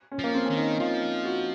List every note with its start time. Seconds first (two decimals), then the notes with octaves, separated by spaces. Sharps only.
0.11 C#4
0.19 F3 A#3
0.35 C4
0.46 D#3 C#4
0.57 D#4
0.79 F3 F4
1.25 F#4